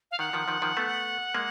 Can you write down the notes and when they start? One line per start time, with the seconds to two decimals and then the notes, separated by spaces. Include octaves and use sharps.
0.11 F5
0.19 D#3 F#5
0.33 D#3 F3
0.48 D#3 F3
0.62 D#3 F3
0.77 A3 B3
1.35 G#3 A#3